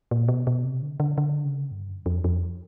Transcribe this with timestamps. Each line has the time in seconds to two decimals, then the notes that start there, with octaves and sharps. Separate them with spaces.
0.11 A#2
0.28 B2
0.47 B2
0.64 C3
0.82 D3
1.00 D3
1.18 D3
1.45 C#3
1.71 G2
1.88 F#2
2.06 F2
2.24 F2